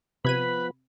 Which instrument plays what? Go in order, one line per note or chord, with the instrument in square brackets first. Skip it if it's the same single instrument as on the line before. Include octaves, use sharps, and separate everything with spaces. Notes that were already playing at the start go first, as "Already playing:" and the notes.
[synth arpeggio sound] C3 G#6 D#7 [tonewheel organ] F3 B3 [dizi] B4 [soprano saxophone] B5